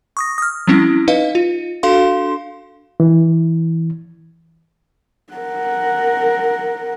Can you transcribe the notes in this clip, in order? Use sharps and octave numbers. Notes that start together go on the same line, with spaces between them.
C#6 D#6 A#6
D#6 F6
F3 G3 C4 C#4 E4
D#4 B4 D#5 F5
F4
D4 F#4 A4 F5 C6
E3
A#4 F#5